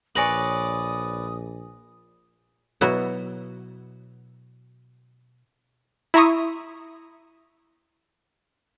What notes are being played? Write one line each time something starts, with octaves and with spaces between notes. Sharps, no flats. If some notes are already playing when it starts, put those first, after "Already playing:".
A#1 B4 C#5 D5 G#5 D#6 A#6 F#7
B2 F#3 B3 E4 F#4
E4 E5 A#5 C6 C#6 D#6